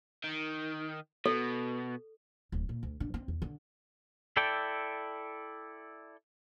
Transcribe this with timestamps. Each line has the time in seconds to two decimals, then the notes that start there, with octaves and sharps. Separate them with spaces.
0.24 D#3
1.26 B2 A4
2.52 D1
2.69 A#2
2.83 D2
3.00 D3
3.14 C4
3.28 E2
3.42 D3
4.37 E4 A4 D5 G5